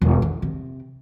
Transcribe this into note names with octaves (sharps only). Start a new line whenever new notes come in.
E1
D3
C3